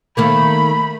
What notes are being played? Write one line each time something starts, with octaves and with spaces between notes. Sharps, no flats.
D#3 A3 A#3 B5